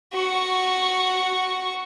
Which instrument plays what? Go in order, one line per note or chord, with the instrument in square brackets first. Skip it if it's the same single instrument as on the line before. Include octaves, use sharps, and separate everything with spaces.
[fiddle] F#4 C#6